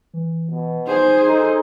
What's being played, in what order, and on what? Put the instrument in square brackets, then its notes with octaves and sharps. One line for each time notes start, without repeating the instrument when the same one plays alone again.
[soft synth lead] E3
[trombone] B2
[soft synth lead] D#4 [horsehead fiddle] G#4 C5
[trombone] D#4 [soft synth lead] A4